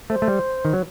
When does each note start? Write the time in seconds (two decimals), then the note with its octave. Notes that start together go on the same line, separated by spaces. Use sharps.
0.10 A3 C5
0.22 A3
0.28 G3
0.65 D#3
0.73 F#3